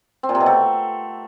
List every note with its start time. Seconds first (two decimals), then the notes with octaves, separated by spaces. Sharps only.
0.23 C4
0.29 A#2
0.35 C3
0.40 B2
0.46 A3